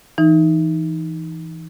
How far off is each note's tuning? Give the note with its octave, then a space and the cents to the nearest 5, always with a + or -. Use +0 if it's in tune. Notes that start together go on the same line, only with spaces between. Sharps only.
E3 +0 D#4 +5